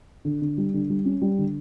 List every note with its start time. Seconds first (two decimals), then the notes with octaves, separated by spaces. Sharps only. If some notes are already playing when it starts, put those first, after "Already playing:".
0.25 D3
0.42 D3
0.58 G3
0.74 D3
0.90 G3
1.05 C#4
1.22 G3
1.38 D3